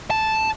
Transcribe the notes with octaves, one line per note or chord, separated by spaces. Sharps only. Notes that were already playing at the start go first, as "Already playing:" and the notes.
A5